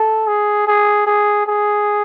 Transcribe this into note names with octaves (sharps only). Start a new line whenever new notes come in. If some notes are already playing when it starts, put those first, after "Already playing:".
Already playing: A4
G#4
G#4
G#4
G#4